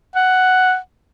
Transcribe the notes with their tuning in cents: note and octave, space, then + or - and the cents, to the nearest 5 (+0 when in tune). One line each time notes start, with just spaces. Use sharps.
F#5 +5